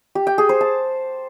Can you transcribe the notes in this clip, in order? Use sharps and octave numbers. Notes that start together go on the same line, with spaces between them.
G4
G5
G#4
C5
A5